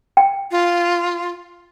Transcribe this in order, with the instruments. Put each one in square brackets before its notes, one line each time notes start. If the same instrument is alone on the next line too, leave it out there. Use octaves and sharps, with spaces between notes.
[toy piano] G5
[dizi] F4